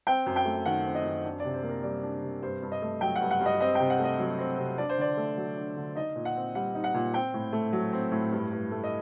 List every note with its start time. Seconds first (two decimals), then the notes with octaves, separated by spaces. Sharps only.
0.07 C4 G5
0.26 F#2
0.36 G5
0.45 A3
0.66 D#3 F#5
0.85 C4
0.95 D#5
1.04 F#2
1.25 D4
1.40 C3 D5
1.54 C5
1.63 A#3
1.69 A#4
1.83 G3 D5
2.03 D4
2.22 C3
2.42 G2 C5
2.62 G2
2.72 D#5
2.82 A3
3.01 F#3 G5
3.16 F#5
3.21 G2
3.31 F#5
3.41 G2
3.46 D#5
3.60 C4 D#5
3.75 C3 G5
3.90 F#5
3.99 A3 D#5
4.19 F#3
4.39 C4
4.58 C3
4.78 D4 D5
4.89 C5
4.98 D3 D5
5.17 A3
5.37 F#3
5.57 D4
5.76 D3
5.95 D#4 D#5
6.16 A#2
6.25 F#5
6.36 C4
6.55 G3 F#5
6.75 D#4
6.84 F#5
6.94 A#2
7.14 C4 G5
7.34 A2
7.53 A3
7.73 F#3
7.93 C4
8.12 A2
8.32 G2
8.52 G2
8.71 A3
8.84 D#5